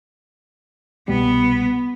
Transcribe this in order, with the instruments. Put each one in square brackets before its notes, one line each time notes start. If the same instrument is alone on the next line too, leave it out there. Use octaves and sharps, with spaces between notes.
[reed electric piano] C2 B2 G3 [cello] B3